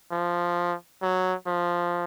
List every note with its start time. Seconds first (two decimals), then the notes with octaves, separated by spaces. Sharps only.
0.12 F3
1.03 F#3
1.47 F3